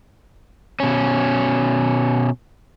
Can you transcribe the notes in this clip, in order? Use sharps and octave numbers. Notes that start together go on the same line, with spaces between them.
B2 C#4